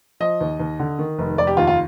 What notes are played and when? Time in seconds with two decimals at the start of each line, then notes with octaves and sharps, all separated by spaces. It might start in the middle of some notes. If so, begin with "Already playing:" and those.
0.20 F3 D#5
0.41 D#2
0.60 D#2
0.79 D3
0.99 D#3
1.19 F1
1.38 F1 D5
1.47 G4
1.57 D#2 F4
1.67 F4